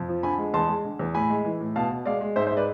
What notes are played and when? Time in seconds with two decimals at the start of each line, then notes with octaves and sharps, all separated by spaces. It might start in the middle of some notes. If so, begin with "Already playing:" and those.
Already playing: F2
0.09 F3
0.23 D3 G#5 B5
0.38 G#3
0.54 E2 A5 C6
0.69 G#3
0.85 D3
0.99 E2
1.14 A2 G#5 B5
1.30 G#3
1.45 E3
1.61 A2
1.76 B2 F5 A5
1.91 B2
2.05 G#3 D5 F5
2.21 G#3
2.36 G#2 C5 E5
2.47 C5 E5
2.52 G#3
2.57 B4 D5